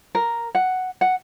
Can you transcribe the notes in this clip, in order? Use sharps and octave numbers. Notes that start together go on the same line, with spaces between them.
A#4
F#5
F#5